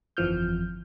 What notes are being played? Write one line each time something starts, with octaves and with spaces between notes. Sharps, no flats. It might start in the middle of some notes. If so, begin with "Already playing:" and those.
G1 F2 E3 F3 F6 G6